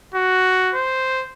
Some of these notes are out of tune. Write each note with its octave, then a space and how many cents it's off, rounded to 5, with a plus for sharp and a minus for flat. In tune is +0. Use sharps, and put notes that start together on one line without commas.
F#4 +5
C5 -5